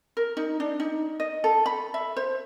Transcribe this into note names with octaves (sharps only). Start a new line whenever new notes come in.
A#4
D#4
D4
D#4
D#5
A4
B5
E5
C5